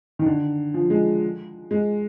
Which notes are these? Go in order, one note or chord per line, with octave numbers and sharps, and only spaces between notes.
D#3
D3
F3
G#3
G#3